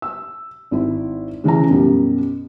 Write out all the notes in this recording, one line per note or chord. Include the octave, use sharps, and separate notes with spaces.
E6
G#1 E4
C#3 E3 E4 A#5
F#2 B2 G3